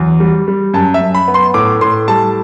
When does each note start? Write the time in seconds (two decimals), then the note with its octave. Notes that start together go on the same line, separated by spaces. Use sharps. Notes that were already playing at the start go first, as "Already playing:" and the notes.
Already playing: E2 F#3
0.20 G3
0.48 G3
0.73 F#2 A5
0.94 E5
1.01 F#2
1.14 B5
1.28 B3
1.34 C6
1.54 A2 D6
1.81 A2 C6
2.08 G3 A5